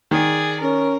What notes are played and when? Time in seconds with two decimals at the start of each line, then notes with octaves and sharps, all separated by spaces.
0.11 D#3 G#4 D5
0.61 C#4 A#4